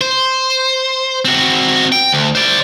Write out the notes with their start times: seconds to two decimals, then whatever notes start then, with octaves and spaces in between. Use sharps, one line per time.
0.01 C5
1.25 C4 F#4
1.92 G5
2.12 D2
2.35 C5 D5